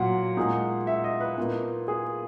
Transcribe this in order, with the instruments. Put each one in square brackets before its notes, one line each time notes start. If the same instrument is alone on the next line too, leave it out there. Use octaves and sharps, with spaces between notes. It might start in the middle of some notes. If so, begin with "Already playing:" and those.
Already playing: [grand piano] A#2 F#3 F#5
A#2 G#3 D#4
E5
D#5
B4
A#2 A#3 D#4
G#4